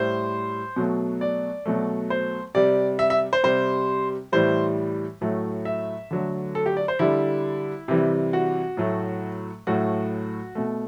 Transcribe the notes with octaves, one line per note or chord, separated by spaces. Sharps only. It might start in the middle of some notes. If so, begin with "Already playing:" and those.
Already playing: A2 G3 C5
B2 F#3 A3
D5
B2 F#3 A3
C5
C3 G3 D5
E5
E5
C5
C3 G3 C5
A2 E3 G3 C5
A2 F#3 A3
E5
D3 F#3 A3
A4
G4
D5
C5
D3 G3 E4
C3 E3 G3
F#4
A2 F#3 A3
A2 F#3 A3 F#4
B2 A3